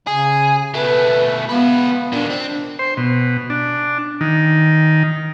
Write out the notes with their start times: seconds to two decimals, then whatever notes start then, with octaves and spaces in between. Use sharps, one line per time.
0.07 C#3 G#4
0.74 B2 A3 B4
1.49 B3 F4 B4
2.13 A#2 D#3 D4
2.30 C4
2.79 C5
2.97 B2
3.50 D4
4.21 D#3